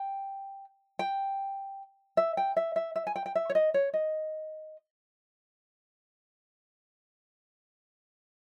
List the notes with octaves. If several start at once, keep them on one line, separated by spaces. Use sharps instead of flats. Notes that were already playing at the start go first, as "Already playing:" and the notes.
Already playing: G5
G5
E5
G5
E5
E5
E5
G#5
G5
G5
E5
C#5
D#5
C#5
D#5